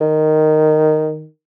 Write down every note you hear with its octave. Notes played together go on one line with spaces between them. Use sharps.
D#3